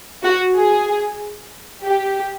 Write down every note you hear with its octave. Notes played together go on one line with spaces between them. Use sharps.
F#4
G#4
G4